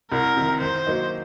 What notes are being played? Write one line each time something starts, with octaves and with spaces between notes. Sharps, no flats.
C2 A#4
C3 D#3
D#3 C5
F#3 A#3 D#4